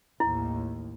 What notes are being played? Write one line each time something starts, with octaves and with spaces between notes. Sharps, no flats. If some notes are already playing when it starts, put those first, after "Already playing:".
A1 D#2 A2 E4